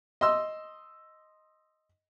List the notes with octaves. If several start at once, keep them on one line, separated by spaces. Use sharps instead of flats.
D#5 C6 E6